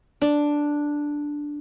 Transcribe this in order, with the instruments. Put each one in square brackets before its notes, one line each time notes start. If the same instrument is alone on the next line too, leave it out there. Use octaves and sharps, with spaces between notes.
[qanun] D4